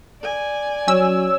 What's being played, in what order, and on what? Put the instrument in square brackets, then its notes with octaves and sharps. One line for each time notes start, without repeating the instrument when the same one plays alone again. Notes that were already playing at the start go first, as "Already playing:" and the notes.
[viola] D5 G#5
[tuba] F#3 [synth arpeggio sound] C#4 E6